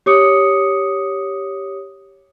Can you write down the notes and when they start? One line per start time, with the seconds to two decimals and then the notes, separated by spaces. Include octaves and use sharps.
0.06 G4 C#5 D6 D#6 C#7